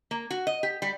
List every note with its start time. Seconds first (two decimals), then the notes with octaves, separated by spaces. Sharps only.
0.11 A#3
0.31 F#4
0.47 D#5
0.63 G4
0.82 G3